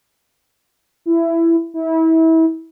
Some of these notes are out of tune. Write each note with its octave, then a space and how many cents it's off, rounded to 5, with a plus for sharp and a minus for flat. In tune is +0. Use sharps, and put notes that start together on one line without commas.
E4 +15
E4 -30